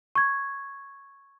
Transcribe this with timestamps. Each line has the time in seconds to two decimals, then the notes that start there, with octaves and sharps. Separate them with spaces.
0.15 C#6 G#6